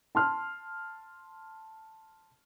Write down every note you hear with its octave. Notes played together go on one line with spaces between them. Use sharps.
A5 C6 F6